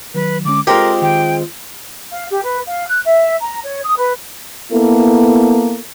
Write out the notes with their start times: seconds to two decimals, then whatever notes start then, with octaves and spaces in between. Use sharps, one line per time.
0.14 D#3 F#3 B4
0.45 D3 G#3 C#4 D6
0.67 G#3 C4 F4 G4 A4 A#4 C6 F6
1.02 D#3 G5
2.11 F5
2.30 G4
2.43 B4
2.66 F5
2.87 F#6
3.05 E5
3.40 A#5
3.63 C#5
3.83 D#6
3.97 B4
4.72 A#3 B3 E4 A4